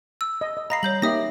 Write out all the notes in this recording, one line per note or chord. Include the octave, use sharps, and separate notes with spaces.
E6
D#5
D#5
D#5 F5 A#5 B5 A#6 C7
G3 C#5 G6 F#7
A#3 D#4 G4 E5 D#6 A#6